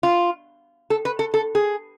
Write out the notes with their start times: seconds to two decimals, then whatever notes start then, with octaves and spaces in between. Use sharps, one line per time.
0.03 F4
0.90 A4
1.05 B4
1.19 A4
1.34 A4
1.55 G#4